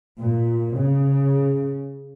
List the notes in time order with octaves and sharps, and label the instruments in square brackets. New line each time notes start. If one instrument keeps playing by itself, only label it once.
[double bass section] A#2
C#3